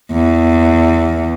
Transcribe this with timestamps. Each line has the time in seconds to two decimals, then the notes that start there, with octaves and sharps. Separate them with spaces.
0.12 E2